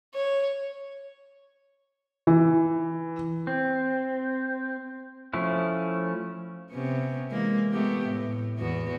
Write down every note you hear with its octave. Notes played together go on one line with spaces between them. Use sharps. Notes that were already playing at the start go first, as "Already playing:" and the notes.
C#5
E3
C4
F3 A3 C#4 E4
C3 B3 C#4
E3 G#3 A#3
A3 B3 G4
A2
E2 B3 F#4